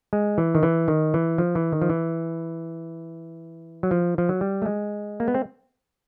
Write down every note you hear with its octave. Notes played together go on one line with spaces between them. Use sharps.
G#3
E3
D#3
E3
D#3
E3
F3
E3
D#3
F3
E3
F#3
F3
F3
F#3
G3
A3
G#3
A#3
B3
C4